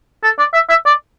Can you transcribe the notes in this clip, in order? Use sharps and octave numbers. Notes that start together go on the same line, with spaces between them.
A4
D5
E5
E5
D5